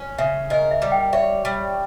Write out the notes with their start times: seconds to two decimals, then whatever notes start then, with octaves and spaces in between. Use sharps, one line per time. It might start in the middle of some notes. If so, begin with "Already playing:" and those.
Already playing: C#4
0.18 C#3 E5
0.50 A#4 D#5
0.71 E5
0.82 G3
0.92 G5
1.13 C#5 E5
1.45 G3